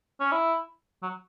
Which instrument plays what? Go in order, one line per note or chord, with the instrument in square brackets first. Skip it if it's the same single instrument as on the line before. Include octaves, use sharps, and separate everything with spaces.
[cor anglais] C#4
E4
F#3